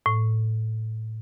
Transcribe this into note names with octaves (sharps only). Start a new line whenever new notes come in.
A2